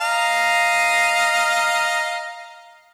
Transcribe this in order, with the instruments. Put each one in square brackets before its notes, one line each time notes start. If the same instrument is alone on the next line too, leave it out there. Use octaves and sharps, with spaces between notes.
[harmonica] D#5 F5 A#5